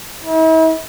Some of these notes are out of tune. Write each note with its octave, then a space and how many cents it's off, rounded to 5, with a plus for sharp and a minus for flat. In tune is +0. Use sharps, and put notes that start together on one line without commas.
E4 -45